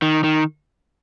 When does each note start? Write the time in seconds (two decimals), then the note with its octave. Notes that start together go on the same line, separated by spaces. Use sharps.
0.02 D#3
0.24 D#3